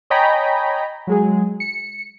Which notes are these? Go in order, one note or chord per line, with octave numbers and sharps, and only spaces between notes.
C#5 D#5 G5 G#5 A#5 B5
F#3 G#3 G#4
C#7